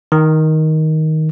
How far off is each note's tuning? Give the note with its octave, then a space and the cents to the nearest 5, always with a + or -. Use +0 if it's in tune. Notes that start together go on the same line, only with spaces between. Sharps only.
D#3 +10